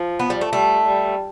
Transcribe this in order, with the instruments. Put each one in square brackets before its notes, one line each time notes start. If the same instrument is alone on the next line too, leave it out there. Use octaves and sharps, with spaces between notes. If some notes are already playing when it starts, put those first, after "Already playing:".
Already playing: [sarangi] F3
[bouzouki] B3
G3
A3
[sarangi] G3 [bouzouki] A3
[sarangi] G3